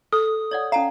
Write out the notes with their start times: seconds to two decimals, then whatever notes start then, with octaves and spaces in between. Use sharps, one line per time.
0.13 A4 D#6
0.51 C#5 D5 F#5
0.72 C#4 F5 A5 A#5